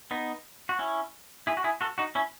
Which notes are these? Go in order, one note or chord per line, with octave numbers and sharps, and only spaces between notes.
B3 D#4
F#4
C#4 E4
E4 G#4
F#4
E4 G#4
F#4 A4
D#4 F#4
C#4 E4